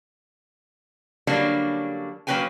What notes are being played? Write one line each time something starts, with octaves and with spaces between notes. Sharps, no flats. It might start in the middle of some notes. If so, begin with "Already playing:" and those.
D3 F#3 G3 A#3 C#4 D4
F#3 A#3 C#4 B4 G5 G#5